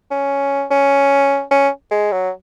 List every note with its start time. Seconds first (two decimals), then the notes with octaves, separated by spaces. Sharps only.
0.11 C#4
0.71 C#4
1.51 C#4
1.91 G#3
2.12 F#3